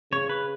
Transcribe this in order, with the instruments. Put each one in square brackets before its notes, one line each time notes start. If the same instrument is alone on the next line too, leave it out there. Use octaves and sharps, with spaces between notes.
[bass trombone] C#3 [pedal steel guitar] C#5
[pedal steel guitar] B4